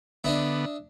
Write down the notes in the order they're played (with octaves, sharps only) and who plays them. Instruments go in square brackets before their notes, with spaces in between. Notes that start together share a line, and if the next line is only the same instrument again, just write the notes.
[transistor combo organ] D3 B3 [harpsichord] D4 D#5 E5